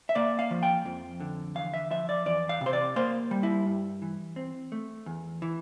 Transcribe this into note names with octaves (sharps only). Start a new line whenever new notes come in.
E5
A#3 D5
F5
F3
G5
F2
D3
E2 F5
E5
F3 E5
D5
E2 D5
F5
C3
C5
D5
A#3 C5
G3
E4
G2
E3
C4
A3
E2
E3